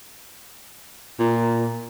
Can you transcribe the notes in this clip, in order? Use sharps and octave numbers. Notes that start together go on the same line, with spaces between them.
A#2